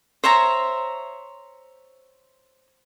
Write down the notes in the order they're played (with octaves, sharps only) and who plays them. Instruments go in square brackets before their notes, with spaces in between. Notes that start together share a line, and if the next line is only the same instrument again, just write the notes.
[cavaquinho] C5 C#5 E5 A#5